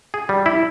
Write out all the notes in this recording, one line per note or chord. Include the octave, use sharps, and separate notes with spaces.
G#4
G3
E4